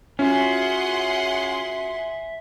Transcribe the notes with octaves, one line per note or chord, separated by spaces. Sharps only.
C#4 F4 F#4 G#4 E5 F#5 C6